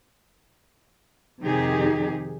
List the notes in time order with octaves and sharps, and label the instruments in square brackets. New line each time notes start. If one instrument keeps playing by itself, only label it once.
[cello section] F2 C3 D#3 D#4 G4 G#4